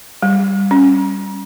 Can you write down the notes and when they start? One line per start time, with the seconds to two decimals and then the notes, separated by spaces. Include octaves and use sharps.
0.22 G3
0.71 C#4